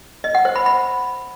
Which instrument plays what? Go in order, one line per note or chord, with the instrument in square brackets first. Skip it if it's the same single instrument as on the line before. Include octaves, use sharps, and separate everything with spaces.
[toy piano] D#5
F#5
C5
B5
B5